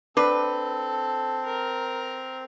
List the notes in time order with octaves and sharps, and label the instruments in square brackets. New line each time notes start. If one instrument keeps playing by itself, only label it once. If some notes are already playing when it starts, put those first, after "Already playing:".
[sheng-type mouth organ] C4 [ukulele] D4 [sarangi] A4 [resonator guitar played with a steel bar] B4
[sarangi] A#4